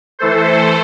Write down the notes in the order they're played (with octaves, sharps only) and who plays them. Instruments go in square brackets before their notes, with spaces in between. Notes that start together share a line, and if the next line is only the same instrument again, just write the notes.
[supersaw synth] E3 A3 A4 C5